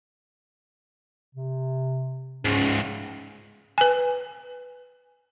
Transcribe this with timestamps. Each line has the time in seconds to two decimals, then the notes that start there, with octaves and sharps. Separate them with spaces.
1.35 C3
2.45 C#2 G#2 C#4
3.78 B4 G#5